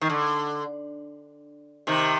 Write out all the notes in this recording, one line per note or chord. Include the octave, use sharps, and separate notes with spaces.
D#3
D3
C3 D#3